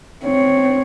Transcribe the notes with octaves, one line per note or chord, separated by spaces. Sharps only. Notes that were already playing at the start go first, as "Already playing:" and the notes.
C4 C#5